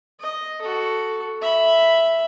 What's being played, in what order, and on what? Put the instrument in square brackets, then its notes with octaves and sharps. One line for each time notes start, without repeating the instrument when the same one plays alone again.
[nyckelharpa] D#5
F#4 A4
E5 B5